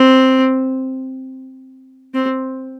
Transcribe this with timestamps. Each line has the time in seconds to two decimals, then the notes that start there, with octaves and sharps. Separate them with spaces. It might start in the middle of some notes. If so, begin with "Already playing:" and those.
Already playing: C4
2.14 C4